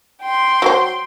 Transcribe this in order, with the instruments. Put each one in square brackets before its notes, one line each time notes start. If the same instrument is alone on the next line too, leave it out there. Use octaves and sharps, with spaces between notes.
[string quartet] G5 C6
[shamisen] F#3 G4 C5